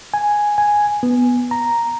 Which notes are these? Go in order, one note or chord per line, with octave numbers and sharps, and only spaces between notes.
G#5
G#5
B3
A#5